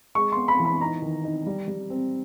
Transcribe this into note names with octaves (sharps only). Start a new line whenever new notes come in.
G#3 C#6
B3 C6
B5
E3
B5
D#4 A#5
D#3
D#4
G3
G3
C4